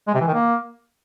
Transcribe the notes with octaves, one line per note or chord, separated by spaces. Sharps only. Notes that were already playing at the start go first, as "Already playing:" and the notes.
G#3
C3
E3
D#3
A#3